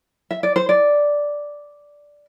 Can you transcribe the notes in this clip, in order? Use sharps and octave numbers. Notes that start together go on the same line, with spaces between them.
E5
D5
C5
D5